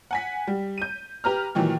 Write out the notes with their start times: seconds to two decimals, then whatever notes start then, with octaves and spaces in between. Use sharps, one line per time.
0.11 F#5 G#5 B6
0.47 G3
0.78 G6 D#7
1.24 G4 B4 A#5 F6
1.55 A#2 D#3 E3 F#3